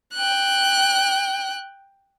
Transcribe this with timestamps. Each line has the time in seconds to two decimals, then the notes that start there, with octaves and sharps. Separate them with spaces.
0.14 G5 F#6